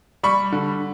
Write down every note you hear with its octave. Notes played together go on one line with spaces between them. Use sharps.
G3 B5 C#6
D3